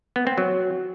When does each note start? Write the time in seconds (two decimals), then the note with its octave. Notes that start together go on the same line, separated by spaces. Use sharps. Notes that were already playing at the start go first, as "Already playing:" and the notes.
0.16 B3
0.27 C4
0.38 F#3